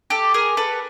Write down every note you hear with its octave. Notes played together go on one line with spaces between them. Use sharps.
G4 A4
G#4 A#4
A4 B4